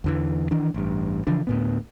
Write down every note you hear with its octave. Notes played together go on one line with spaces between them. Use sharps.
E2 D3 E3
D#3 E3 D4
A1 G2
C#3 E3 F3 D4
D2 A2 B3